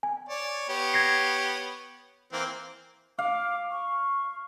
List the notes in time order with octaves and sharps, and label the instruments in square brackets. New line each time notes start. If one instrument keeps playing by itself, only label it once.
[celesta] G#5
[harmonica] C#5 D5
B3 G4 C#5
[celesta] G#6 A#6 C7
[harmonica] E3 A#3 C4
[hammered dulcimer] F5 [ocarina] D6
[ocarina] C#6